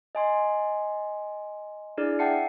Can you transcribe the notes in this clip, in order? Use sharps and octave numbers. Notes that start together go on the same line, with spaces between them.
D#5 G#5 C6
D4 E4 G#4 D5 F6
E5 F#5 G5 A5 C7 C#7